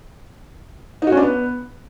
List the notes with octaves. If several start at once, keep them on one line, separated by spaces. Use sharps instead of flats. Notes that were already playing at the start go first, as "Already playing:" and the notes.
D#4
F#4
C#4
D4
B3